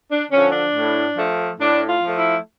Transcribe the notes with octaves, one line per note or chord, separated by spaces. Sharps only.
D4
D3 F3 C#4
D4
A2
F3 A3
A2 D4
F4
F3 A3
E4